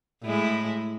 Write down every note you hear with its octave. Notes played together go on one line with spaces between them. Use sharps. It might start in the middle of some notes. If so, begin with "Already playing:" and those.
A2 G#3 E4